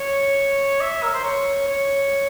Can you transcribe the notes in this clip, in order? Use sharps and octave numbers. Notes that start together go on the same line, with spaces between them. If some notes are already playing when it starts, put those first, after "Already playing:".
Already playing: C#5
E5
A#4
C5
C#5
C#5